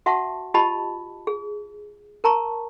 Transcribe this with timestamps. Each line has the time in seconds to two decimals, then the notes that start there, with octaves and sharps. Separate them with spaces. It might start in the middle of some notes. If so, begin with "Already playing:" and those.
0.06 F#4 E5 F#5 A5 C#6
0.54 F4 G4 D#5 A5 B5
1.27 G#4
2.24 A#4 A5 A#5 C#6